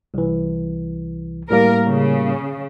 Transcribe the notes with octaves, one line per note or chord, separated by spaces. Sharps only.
C2 E3
A2 G3 A#3 A#4
C#3